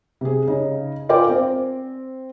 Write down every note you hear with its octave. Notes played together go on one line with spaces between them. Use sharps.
C3 G#4
C#3 D#4
F4 A#4 D5 G5 G#5 D6
C4